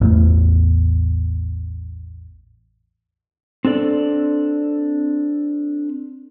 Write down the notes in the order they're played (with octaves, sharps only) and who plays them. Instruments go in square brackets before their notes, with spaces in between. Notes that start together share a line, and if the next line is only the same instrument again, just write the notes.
[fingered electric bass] A1 E2 A2
[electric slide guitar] C4 D4 A4 D5